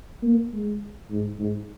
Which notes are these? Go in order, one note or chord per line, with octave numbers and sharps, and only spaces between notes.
A#3
G#3
G#2
G#2